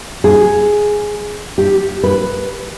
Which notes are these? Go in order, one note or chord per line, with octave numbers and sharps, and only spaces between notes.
G#4
G4
B4